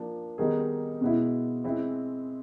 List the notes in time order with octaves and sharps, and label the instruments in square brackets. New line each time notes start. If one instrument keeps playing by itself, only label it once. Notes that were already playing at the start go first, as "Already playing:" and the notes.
Already playing: [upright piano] F3 A#3 D4
D#3 G3 B3 D#4 G#4
B2 G#3 B3 E4
E3 G#3 C4 E4